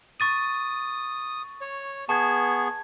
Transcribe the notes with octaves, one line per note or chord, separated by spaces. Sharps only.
C#6 D#6 A6 D#7
C#5
B3 G#4 A5 C#6 G#6